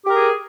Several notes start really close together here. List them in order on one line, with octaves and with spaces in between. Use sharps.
G4 A#4 G#4